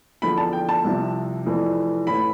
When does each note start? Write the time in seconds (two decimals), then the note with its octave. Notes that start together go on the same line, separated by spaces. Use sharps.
0.22 E2 D3 F3 B5
0.38 A5
0.53 G5
0.69 A5
0.84 C2 C3 F3
1.45 F1 F2 E3
2.07 A1 A2 E3 B5